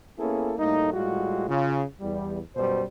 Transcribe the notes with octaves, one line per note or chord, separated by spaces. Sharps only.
A#3 B3 C#4 E4 G#4 A4
A2 G3 A3 A#3 D#4
A2 G3 G#3 F4 F#4
C#3 F4
E2 G3
F#2 B2 G3 C5